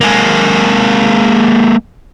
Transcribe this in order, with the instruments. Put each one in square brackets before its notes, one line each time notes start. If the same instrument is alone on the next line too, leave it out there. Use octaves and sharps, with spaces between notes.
[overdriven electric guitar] G#3 A#3